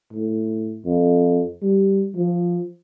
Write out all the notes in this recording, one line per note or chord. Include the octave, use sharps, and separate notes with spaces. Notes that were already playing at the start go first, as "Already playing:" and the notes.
A2
F2
G3
F3